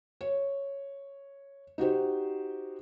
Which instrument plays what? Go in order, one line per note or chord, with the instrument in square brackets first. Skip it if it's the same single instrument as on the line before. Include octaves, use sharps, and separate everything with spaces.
[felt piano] C#5
D#4 F#4 G4 C5